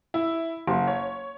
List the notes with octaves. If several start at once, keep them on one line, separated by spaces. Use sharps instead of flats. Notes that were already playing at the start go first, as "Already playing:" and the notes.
E4
F#1
C#5